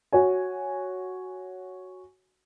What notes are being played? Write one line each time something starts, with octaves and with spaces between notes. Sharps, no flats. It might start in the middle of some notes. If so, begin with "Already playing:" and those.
F#4 C#5 G#5